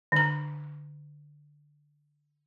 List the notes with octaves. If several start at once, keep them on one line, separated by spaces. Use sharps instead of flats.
D3 A#5